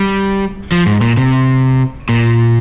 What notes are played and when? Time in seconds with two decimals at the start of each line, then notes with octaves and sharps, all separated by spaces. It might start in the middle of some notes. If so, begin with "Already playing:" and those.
Already playing: G3
0.72 F3
0.86 G#2
1.01 A#2
1.17 C3
2.09 A#2